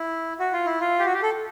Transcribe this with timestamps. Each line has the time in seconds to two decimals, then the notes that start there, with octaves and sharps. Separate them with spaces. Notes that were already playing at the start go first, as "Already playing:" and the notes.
Already playing: E4
0.40 F#4
0.53 F4
0.66 E4
0.80 F4
0.99 G4
1.05 F#4
1.13 G4
1.23 A4